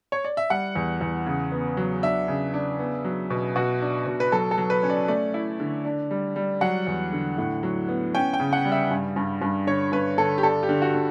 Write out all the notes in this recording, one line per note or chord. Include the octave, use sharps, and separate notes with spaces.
C#5
D5
E5
G3 F#5
E2
E2
C#3
B3
F#3
D4 E5
C#3
D4
B3
F#3
B2
B2 F#4
D4
B2
B4
F#3 A4
A4
F#3
B4
C#4
D5
A3 D5
E4
D3
D4
G3
G3
F#3 F#5
E2
D3
A2
F#3
B3
C#4 G5
G5
C#3
F#5
G3
E5
G2
G2
G2
D3 C#5
G2 B4
D3 A4
G4
D4 A4
G4
D3
F#4
D3